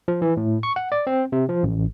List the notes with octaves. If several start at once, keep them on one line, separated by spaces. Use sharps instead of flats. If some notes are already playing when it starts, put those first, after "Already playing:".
F3
E3
A2
C#6
F#5
D5
C4
C3
F3
A1